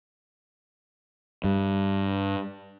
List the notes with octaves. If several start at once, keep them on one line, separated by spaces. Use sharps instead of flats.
G2